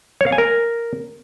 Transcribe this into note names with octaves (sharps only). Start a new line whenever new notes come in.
C#5
F5
G#5
A#4